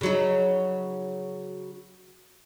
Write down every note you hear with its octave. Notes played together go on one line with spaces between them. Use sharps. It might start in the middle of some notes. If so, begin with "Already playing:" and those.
C#3 F#3 D#4